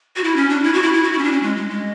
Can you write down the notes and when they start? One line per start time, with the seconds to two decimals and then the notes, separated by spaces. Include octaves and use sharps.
0.16 F#4
0.24 E4
0.36 C#4
0.49 D4
0.64 E4
0.73 F#4
0.83 E4
0.93 E4
1.03 F#4
1.12 E4
1.18 C#4
1.23 D4
1.32 C#4
1.43 G#3
1.56 G#3
1.70 G#3